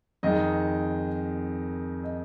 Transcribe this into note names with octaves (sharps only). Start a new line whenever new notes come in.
F2 D#3 G#3 D#5
D#5